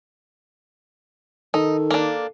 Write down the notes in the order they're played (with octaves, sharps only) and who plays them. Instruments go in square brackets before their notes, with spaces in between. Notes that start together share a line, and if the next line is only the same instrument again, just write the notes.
[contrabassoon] D#3 [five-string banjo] D#4 [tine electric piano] A4
[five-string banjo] A#3 D4